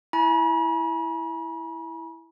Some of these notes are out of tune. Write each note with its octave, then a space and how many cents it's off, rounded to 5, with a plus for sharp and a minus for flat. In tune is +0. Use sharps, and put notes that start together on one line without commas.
E4 +0 G#5 +30 B5 -45